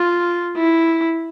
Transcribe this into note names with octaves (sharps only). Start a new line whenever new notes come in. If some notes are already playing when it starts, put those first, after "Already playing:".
Already playing: F4
E4